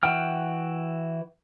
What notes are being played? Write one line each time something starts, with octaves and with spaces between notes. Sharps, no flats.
E3 F#4 F#5 G5 F6